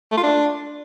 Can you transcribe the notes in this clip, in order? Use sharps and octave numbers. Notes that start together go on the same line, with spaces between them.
A3
F4
D4